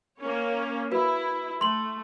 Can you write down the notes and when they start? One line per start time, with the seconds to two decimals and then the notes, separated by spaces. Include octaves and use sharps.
0.18 A#3 C#4 C#5
0.92 E4 F#4 B4
1.61 A3 C6 F#7